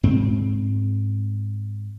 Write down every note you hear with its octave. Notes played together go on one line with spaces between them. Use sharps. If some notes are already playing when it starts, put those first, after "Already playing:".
G#2 C4